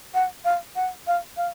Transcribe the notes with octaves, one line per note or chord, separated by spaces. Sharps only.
F#5
F5
F#5
F5
F5